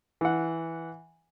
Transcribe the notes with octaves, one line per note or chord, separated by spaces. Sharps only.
E3 F#5